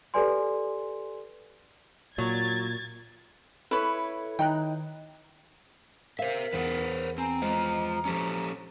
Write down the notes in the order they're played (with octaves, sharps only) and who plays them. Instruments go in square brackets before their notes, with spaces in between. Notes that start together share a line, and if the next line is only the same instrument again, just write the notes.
[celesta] G4 A4 B4 D5 G#5 C6
[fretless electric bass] A#2 [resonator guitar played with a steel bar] F#3 [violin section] G#6 A6
[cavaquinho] E4 B4 C#5 [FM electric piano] A4
[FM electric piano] D#3 [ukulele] D#4 [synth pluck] G5 A#5 F#6
[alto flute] A#4 [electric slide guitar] C5 E5 [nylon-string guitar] F5 [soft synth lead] B6
[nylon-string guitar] E2 [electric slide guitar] B4 C5 F#5
[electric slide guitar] C4 [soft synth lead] G#5 [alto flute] A#5
[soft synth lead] G#3 [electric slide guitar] F4 C5 D#5
[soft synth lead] F3 [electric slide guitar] C#4 G4 A4